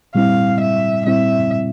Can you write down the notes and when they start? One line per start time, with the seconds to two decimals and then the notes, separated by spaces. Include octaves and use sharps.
0.15 A#2 G3 C4 E4 F5
0.60 E5
1.06 A#2 G3 C4 E4 E5